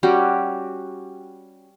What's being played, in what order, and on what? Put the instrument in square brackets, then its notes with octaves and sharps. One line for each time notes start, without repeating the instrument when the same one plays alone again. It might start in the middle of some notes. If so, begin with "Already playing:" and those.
[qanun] G3 C#4 F#4 G4